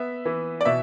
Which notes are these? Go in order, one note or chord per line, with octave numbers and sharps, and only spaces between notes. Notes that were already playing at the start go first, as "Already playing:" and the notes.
Already playing: B3 E5
E3
D5
B2 E5